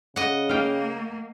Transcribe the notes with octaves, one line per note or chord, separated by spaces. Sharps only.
C#3 D#5 F#5
A#3 F5 G5